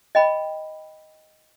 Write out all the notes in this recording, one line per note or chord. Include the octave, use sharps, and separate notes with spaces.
D#5 G5 B5